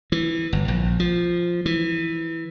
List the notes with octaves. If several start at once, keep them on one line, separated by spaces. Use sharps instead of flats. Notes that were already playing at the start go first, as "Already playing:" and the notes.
E3
G1
A#1
F3
E3